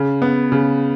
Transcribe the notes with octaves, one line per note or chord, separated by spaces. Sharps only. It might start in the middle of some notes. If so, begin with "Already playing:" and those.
Already playing: C#3
B3
C#3